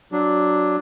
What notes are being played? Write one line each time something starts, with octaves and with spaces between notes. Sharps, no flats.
F#3 D4